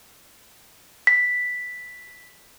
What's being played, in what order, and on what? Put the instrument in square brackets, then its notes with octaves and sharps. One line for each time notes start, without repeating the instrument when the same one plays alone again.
[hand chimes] B6